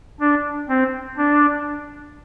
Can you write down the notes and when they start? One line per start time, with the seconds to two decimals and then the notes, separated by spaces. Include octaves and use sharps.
0.20 D4
0.69 C4
1.17 D4